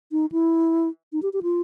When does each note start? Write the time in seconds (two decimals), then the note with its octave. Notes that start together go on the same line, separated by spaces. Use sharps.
0.12 D#4
0.32 E4
1.13 D#4
1.22 G4
1.33 G4
1.43 F4